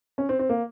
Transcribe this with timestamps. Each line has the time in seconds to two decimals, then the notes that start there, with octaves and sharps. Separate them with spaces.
0.18 C#4
0.29 C4
0.39 C4
0.49 A#3